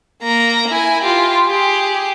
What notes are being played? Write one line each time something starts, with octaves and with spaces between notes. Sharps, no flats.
A#3 A#5
E4 G#5
F4 G4
G4 G#4